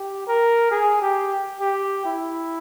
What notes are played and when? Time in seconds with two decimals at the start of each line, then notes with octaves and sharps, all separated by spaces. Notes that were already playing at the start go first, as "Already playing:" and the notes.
Already playing: G4
0.27 A#4
0.71 G#4
1.01 G4
1.60 G4
2.05 E4